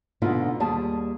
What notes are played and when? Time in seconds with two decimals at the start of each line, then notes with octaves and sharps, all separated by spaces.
0.22 G#2 B2 D3 B3 D#4 F4
0.60 D#2 G3 G#4 A5